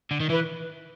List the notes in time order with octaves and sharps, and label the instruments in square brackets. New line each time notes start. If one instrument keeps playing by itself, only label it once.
[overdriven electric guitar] D3
D#3
[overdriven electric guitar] E3 [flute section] B4